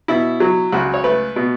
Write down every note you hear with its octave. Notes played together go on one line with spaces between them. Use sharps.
B2 E4
F#3
C#2 F#4
C#5
A3 B4
B2